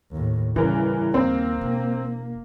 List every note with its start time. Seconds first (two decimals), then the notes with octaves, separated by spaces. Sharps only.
0.11 D#2 A2
0.56 C#3 E3 G3 C#4 D4 A#4
1.14 D#2 A#3 C4
1.61 E1